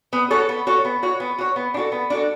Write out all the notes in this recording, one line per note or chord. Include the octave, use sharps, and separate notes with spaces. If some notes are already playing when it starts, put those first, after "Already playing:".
B3
F#4 A4 C#5
B3
F#4 A4 C#5
B3
F#4 C#5
B3
F#4 C#5
B3
D4
F#4 A4
B3
D4 F#4 A4